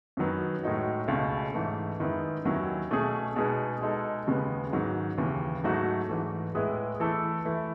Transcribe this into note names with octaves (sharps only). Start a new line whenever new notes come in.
F#2 D#3 F#3 B3
A2 G#3 D#4 F#4
C#2 B2 A3 C#4
G#2 E3 A3
F#2 D#3 G#3 B3 E4
D#2 D#3 F#3 C#4 E4
B2 A3 C#4 G#4
B2 G#3 D#4 G#4 B4
B2 G#3 D#4 A4
D#2 C#3 G#3 B3
G#2 D#3 F#3
D#2 C#3 E3
G#2 F#3 A3 D#4 F#4
G#2 E3 A3
A2 G#3 B3 E4 G#4
E3 A3 E4 A4
E3 A3 E4